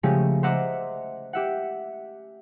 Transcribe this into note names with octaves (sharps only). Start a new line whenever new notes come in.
C#3 F3 G#3 A3 C#4 G4
C5 D#5 E5 F#5 A#5 D6
G4 E5 F#5